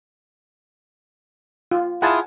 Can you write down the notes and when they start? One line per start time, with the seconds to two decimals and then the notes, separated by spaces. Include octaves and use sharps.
1.71 F4
2.02 E4 F4 G#4 F#5 G#5 A5